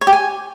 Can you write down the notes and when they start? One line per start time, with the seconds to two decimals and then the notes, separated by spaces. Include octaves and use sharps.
0.01 C#5
0.07 G4
0.13 G#5